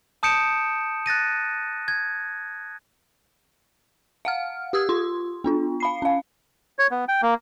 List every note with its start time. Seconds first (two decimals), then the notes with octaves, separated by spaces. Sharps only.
0.23 A5 D#6 G6 C#7 D7 E7
1.06 F#6 A6 A#6 D#7
1.88 G#6
4.25 F5 F#5 F6
4.73 G4 D#6 E6 G#6
4.89 F4 C6
5.44 B3 D4 F4
5.80 F5 B5 C7
6.02 C#4 F5
6.79 C#5
6.91 B3
7.08 G5
7.22 A#3